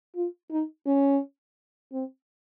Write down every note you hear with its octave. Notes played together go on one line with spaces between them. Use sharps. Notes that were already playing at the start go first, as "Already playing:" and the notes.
F4
D#4
C#4
C4